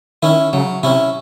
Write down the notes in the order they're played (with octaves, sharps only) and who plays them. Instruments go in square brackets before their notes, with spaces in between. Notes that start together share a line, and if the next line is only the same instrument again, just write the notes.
[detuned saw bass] D#3 [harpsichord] C#4 E4
[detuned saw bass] C#3 [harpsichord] F#3
[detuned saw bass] C3 [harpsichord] C#4 E4